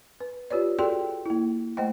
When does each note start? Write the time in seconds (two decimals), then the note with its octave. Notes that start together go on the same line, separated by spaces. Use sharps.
0.20 B4
0.50 F4 G4 B4 C#5 D5
0.79 F#4 G#4 A4 D5 G5 C6
1.26 A#3 E4
1.77 A3 C5 D#5 G5